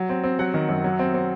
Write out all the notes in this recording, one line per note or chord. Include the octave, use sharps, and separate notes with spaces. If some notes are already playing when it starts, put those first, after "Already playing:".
Already playing: F#3
C4
C4
F#3 F#5
D#3
F#2
F#3
C4
C4